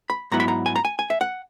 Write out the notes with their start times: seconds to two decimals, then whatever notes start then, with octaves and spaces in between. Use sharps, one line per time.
0.10 B5
0.32 G#2 F#3 B3 E4 A#5
0.40 B5
0.48 A#5
0.66 G#5
0.76 A#5
0.85 G#5
0.99 G#5
1.10 E5
1.21 F#5